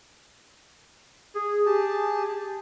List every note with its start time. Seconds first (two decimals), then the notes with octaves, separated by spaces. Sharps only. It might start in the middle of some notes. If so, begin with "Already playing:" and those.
1.35 G#4
1.66 G4 G#4 A5